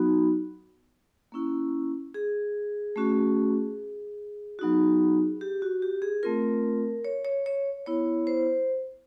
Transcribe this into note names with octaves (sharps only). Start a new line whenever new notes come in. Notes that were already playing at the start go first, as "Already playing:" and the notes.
Already playing: F#3 B3 D#4 F#4
A#3 C#4 E4
G#4
A3 C#4 F#4
F#3 B3 D#4 F#4
G4
F#4
G4
G#4
A3 C4 F4 A#4
C#5
C#5
C#5
B3 E4 C#5
C5